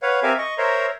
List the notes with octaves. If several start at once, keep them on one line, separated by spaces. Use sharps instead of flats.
B4 C#5 F5 F#5
C4 G4 A#4 E5 F5 G#5
D#5 C#6
A#4 C5 C#5 E5 A#5 C6